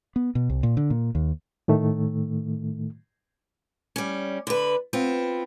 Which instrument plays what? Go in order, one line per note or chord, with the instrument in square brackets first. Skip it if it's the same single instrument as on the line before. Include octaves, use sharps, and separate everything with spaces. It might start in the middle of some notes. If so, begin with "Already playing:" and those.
[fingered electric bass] B3
B2
C2
A#2
D3
A#2
D#2
[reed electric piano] A2 D#3 A3
[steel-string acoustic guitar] G3 C#4
D3 B4
B3 C4 F4